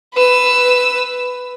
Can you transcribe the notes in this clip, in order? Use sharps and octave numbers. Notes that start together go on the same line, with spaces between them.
B4 E6